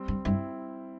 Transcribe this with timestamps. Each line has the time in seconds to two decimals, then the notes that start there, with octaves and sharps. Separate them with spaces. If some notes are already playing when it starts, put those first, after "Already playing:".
Already playing: G3 C4
0.08 G2
0.25 G2 C4 E4